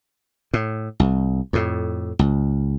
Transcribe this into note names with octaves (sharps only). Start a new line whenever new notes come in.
A2
C2
F2 A2
C#2